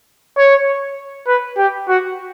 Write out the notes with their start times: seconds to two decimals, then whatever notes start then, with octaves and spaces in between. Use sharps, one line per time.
0.37 C#5
1.27 B4
1.57 G4
1.88 F#4